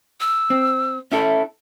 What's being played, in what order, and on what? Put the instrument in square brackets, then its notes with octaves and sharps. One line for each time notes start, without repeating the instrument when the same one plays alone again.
[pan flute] E6
[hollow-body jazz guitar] C4
[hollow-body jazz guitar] C#4 E4 A4 [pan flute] E5